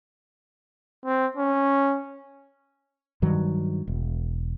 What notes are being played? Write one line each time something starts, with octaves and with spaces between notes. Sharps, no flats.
C4
C#4
G2 D#3 F#3
E1